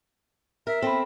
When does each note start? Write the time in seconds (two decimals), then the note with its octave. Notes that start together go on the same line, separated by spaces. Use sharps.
0.67 A#4 E5
0.82 C4 A4 B5